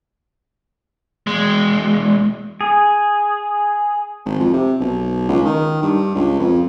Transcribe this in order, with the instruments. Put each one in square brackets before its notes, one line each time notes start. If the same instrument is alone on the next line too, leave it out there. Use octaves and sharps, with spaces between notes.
[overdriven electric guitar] E2 G#3
[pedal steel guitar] G#4
[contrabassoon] G#1
F2
C3
B1
C#2
D#3
G2
C#2
F2